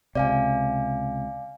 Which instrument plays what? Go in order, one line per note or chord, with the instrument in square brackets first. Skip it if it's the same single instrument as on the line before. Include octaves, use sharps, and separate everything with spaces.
[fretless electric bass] C#2 C3 [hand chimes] D5 F5 G#5